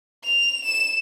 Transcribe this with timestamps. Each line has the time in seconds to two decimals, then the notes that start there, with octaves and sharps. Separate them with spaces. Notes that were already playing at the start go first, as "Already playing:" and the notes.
0.23 F7
0.65 E7